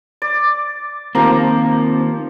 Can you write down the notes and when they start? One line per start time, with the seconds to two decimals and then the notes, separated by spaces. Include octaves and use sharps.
0.22 D5
1.15 D#3 F3 A#3 C4 G4 A#5